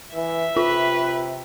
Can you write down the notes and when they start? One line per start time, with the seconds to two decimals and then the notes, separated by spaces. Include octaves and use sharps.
0.14 E3 E5
0.57 C3 F4 B4